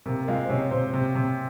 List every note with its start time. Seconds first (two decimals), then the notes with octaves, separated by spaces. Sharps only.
0.06 C3 A#3 A#4
0.28 G#3 F4 F5
0.44 C5
0.49 C3 C#4 C#5
0.71 C3 C4 C5
0.94 C3
1.15 C3